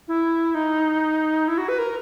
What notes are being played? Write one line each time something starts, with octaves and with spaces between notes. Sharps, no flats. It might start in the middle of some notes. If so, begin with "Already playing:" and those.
E4
D#4
E4
F#4
B4
A#4